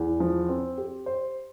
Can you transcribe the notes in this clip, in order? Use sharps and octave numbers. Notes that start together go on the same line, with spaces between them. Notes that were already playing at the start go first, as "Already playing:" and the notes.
Already playing: E2
F3
C4
G4
C5